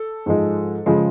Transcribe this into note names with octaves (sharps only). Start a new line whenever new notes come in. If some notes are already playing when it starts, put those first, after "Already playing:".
Already playing: A4
G#2 F3 G#3
C#3 F3 G#3